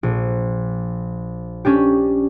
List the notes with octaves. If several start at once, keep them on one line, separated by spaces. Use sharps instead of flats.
A#1
C#4 D4 G4